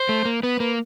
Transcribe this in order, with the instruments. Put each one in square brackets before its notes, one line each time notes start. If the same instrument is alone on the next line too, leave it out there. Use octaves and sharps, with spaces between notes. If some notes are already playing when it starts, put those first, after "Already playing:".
Already playing: [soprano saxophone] C5
[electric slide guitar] A3
A#3
[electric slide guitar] B3 [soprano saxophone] B4
[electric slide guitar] A#3 [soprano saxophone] B4